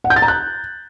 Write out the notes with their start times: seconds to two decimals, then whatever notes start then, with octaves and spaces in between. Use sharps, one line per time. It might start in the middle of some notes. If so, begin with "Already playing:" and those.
0.04 F#5
0.10 G6
0.16 A6
0.22 A#5
0.28 F#6